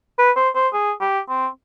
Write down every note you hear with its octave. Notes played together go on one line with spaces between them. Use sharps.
B4
C5
C5
G#4
G4
C4